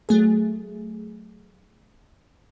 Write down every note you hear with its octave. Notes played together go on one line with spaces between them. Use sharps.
F#3 A3 G#4